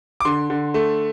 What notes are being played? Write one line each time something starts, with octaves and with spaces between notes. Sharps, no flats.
D6
D3 C6
D3
A3